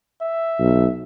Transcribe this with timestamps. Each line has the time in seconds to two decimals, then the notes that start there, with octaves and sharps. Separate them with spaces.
0.21 E5
0.59 B1